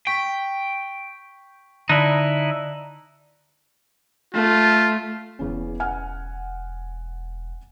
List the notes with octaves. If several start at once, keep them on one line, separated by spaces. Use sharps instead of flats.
G5 C#6 B6
D3 D#4 E4 D5 A5 F#6
A3 F4
E1 E2 C#3 C#4
F#5 G#5 F6